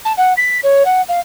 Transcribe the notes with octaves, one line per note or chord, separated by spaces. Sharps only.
A5
F#5
B6
C#5
F#5
F5